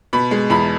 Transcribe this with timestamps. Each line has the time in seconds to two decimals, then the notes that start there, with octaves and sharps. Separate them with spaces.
0.13 B2 B5
0.31 G#3
0.50 E2 B5